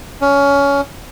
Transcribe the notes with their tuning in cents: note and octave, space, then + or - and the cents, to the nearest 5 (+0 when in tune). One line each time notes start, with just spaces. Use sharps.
C#4 +20